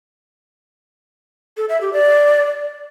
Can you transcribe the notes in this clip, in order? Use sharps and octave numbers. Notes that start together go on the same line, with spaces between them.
A4
E5
G4
D5